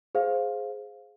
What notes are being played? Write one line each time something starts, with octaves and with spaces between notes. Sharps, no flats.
G#4 C5 F5